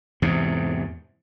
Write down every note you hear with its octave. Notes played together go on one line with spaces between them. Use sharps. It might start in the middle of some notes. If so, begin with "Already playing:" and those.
E2 G#2 C3